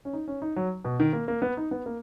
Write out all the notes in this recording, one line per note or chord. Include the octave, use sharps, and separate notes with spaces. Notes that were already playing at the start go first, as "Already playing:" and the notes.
C#4
D#4
C#4
D#4
F#3
B2
D#3
A#3
A#3
B3
D#4
B3
A#3